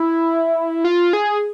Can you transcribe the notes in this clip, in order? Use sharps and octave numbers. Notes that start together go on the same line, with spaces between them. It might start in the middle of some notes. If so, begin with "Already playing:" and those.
Already playing: E4
F4
G#4